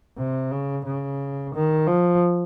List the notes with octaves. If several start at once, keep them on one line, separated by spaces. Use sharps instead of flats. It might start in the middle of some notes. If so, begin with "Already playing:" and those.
C3
C#3
C#3
D#3
F3